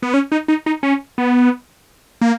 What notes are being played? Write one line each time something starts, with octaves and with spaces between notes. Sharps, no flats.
B3
C#4
D#4
D#4
D#4
C#4
B3
A#3